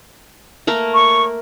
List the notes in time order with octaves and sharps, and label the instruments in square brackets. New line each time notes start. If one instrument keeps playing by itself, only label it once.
[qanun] A3 A#3 A#4
[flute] C#6